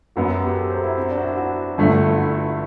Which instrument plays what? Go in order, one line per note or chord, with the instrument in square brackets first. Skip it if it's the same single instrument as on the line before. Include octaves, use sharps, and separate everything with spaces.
[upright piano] F#2 F#3 B3 [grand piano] F#4
[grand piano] F#4
G4
A4
C5
E4
C4
D4
F#4
E4
F#4
[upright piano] G1 G2 D3 A3
[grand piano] E4
F#4